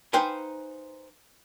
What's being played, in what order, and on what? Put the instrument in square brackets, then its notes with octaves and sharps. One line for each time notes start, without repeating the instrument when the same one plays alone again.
[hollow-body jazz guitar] D#4 B4 C5 F5 G5 G#5